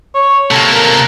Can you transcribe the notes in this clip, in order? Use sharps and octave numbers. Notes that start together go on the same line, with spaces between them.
C#5
C3 A#3 A4
A#4